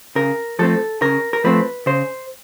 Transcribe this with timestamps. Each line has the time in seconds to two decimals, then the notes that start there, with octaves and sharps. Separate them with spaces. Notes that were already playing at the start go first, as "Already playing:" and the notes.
0.15 C#3 A#4
0.59 F3 A3 C4 A4
1.01 C#3 A#4
1.33 A#4
1.44 F3 A3 C4 B4
1.86 C#3 C5